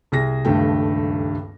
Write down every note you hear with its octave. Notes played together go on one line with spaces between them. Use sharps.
C2 G#4 A#6
D#1 C#2 G2 A3 G5